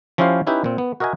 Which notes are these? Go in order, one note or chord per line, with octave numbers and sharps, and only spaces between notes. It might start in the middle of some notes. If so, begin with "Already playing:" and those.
F3 C#4 E4 G4 C5 F5
C#4 D#4 E4 G4 B4
A#2 C4
B3
F#4 A#4 D#5 E5 G#5